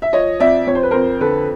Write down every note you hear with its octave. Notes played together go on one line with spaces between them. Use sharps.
E5
F3 C#5 D#5
F2 D5 E5
F2 C#5
C5
B4
F2 A#4 C5
D3 A4 B4